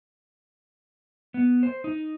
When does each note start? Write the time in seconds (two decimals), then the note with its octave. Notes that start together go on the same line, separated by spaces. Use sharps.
1.34 B3
1.63 C5
1.84 D#4